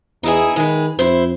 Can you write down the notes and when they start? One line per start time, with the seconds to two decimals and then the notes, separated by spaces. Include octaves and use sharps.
0.23 E2 D#4 E4 G#4
0.56 D#3 G#3 B4
0.99 F2 E4 C5